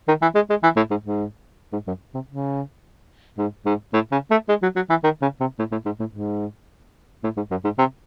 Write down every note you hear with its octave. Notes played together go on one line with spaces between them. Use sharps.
D#3
E3
G#3
G#3
E3
A2
G#2
G#2
G#2
F#2
C3
C#3
G#2
G#2
A2
C#3
A3
G#3
F#3
F#3
E3
D#3
C#3
C3
A2
A2
G#2
A2
G#2
A2
G#2
F#2
G#2
C3